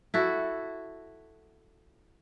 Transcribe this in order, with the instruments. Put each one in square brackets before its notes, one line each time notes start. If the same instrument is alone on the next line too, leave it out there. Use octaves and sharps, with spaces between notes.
[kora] E4 F#4 A4